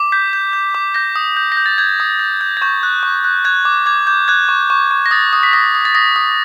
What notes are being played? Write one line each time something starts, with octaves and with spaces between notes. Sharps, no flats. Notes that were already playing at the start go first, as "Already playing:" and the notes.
Already playing: D6
G6 B6
G6
G6
D6
G6 A#6
D#6
G6
A#6
G6
A6
G6 G#6
D#6
G6
G6
G#6
C#6 G6
F#6
C#6
F#6
F#6 G#6
D6
D6 G#6
D6 G6
F#6 G#6
C#6
C#6
C#6
A#6
D#6 A6
D#6
B6
D#6 A#6
D#6
A6
D#6 A#6
D#6